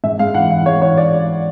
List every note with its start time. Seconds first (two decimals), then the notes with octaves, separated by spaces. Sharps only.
0.04 G#2 E5
0.19 G#3 F5
0.34 E3 F#5
0.51 E3 F5
0.66 G#3 C#5
0.82 E3 C#5
0.97 D5